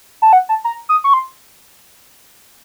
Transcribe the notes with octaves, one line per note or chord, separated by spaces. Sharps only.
A5
F#5
A5
A#5
D#6
C#6
C6